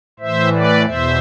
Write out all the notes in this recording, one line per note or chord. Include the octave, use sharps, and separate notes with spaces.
A2 E3 C5 E5
B4 D5
E2 B2 C5 E5